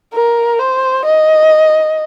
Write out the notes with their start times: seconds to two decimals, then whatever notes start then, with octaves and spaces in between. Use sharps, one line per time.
0.13 A#4
0.59 C5
1.05 D#5